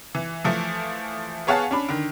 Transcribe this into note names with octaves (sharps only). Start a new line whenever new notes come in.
E3
E3 F3 A3
B3 G#4 C#5 F5 F#5 A5
C#4 D4 B5
D3 D#3